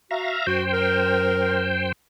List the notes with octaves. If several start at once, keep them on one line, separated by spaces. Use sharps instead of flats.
F#4 E5 F5 A#5
F#2 F#4 C5 G5
A#4